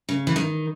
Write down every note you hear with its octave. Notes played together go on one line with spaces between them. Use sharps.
C#3
E3
D#3